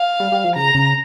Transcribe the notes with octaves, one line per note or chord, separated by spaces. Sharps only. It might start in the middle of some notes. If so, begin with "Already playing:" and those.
Already playing: F5
G3
G3
F3
C#3 A#5
C#3